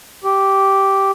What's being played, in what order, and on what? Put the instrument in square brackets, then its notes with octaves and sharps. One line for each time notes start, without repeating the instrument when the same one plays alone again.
[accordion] G4